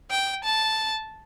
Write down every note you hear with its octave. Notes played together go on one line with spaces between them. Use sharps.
G5
A5